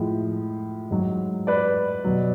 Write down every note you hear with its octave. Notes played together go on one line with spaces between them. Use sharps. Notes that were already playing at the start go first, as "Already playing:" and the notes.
Already playing: A2 F3 G#3
G#2 F#3
B4 D5
B2 F#3